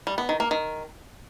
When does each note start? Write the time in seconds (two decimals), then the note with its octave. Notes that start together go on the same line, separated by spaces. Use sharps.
0.07 G3
0.18 B3
0.29 D#3
0.40 A#3
0.51 D#3